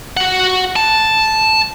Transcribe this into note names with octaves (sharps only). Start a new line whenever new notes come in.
F#4 F#5
A5